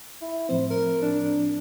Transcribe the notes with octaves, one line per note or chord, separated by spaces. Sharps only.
E4
A2 F3 C4 C5
A#4
D4